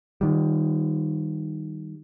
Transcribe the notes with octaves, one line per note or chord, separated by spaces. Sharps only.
D#3 G3